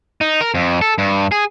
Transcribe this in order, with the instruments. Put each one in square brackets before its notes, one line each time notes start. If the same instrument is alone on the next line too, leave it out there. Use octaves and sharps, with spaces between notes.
[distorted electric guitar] D#4
A#4
F2
A4
G2
G#4